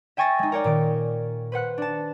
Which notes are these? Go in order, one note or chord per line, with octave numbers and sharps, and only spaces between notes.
E5 G5 G#5 C#6 A6 A#6
G#3 D#4
A#4 C#5 D5 G5
A#2 D#3 D7
B4 C5 F#5 F#6
D4 A5